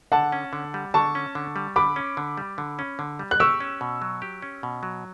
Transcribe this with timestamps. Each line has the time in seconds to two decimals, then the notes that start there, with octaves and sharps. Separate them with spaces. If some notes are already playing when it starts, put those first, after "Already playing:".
0.12 D3 F#5 A5
0.32 C#4
0.53 D3
0.74 G3
0.94 D3 A5 C#6
1.15 C#4
1.35 D3
1.56 G3
1.76 D3 B5 D6
1.96 C#4
2.17 D3
2.38 G3
2.58 D3
2.79 C#4
2.99 D3
3.19 G3
3.31 F#6
3.40 G4 C#6 E6
3.60 C#4
3.81 B2
4.02 F#3
4.22 G4
4.42 C#4
4.63 B2
4.83 F#3